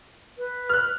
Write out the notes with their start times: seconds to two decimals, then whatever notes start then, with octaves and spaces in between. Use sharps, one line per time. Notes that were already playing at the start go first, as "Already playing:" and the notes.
0.37 B4
0.69 F6 F#6